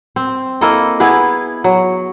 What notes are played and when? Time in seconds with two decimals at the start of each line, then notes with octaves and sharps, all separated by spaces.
0.16 C4
0.61 A#3 E4 A4 D#5
1.00 B3 E4 G#4 B4
1.64 F#3